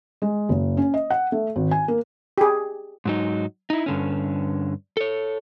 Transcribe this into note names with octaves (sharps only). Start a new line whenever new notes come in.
G#3
F#1
C#4
D#5
F#5
A3
G#1
G#5
A#3
G4 G#4
G#2 F#3 D#4
D#4 E4
G2 D3 C#4
A4 C#5